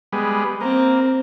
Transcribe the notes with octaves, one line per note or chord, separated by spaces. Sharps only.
G3 G#3 B3
A#3 C4